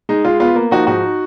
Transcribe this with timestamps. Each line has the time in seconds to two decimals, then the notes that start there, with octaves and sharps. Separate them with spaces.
0.09 G#3 D#4
0.25 G#3 F4
0.40 B3 F4
0.56 A#3
0.71 F3 D#4 F#4
0.87 G#2 D#4 F#4